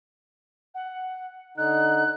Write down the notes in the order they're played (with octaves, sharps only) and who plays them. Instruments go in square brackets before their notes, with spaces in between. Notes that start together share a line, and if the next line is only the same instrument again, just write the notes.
[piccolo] F#5
[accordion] D3 D#4 [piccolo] F#6